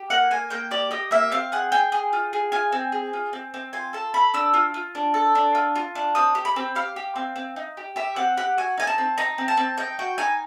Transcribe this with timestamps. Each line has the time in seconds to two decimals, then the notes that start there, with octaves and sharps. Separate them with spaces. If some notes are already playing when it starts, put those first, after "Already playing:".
Already playing: G4
0.10 A#3 F#5
0.31 A#3 G#5
0.50 A#3 G5
0.71 G4 D5
0.91 G4 D#5
1.11 A#3 E5
1.32 C4 F5
1.52 G#4 F#5
1.72 G#4 G5
1.92 G#4
2.13 F4
2.33 G#4
2.52 F4 G#5
2.72 C4
2.92 G#4
3.13 F4
3.33 C4
3.54 C4
3.73 F4 G#5
3.93 A4 A5
4.14 A4 B5
4.34 D4 E6
4.54 F4
4.74 F4
4.95 D4
5.14 A4
5.35 D4
5.55 F4
5.76 F4
5.95 D4
6.15 C4 D#6
6.35 G4
6.45 B5
6.56 C4
6.75 G4 F5
6.96 G4
7.16 C4
7.36 C4
7.56 D#4
7.77 G4
7.96 G4 E5
8.16 C4 F#5
8.37 G4 F#5
8.58 F#4 G#5
8.78 D#4 G#5
8.87 A5
8.98 C4
9.18 D#4 A#5
9.38 C4
9.48 A5
9.57 C4
9.78 D#4 G5
9.99 F#4 G5
10.18 D#4 G#5